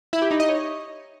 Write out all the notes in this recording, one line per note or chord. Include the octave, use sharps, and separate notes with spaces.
E4
G4
D#4
D#5
C#5